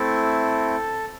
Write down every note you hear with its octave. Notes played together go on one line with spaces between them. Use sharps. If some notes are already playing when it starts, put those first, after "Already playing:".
Already playing: A3 C4 E4 A4